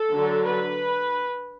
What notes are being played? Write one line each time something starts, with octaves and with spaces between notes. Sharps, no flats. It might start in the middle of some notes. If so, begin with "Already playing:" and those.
Already playing: A4
D3 F#3 D4
B4